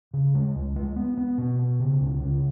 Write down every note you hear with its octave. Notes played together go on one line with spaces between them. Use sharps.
C#3
G#3
C#2
G#3
B3
B3
B2
B3
C#3
C#2
C#3